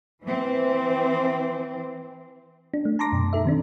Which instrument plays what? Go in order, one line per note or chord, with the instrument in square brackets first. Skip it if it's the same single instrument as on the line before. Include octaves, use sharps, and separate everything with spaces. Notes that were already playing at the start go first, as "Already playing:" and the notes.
[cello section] E3 C4
[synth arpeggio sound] D4
A3
A5 A#5 C6 D6 A#6
F#2 B2
D#4 A4 E5
D#3 C4 D4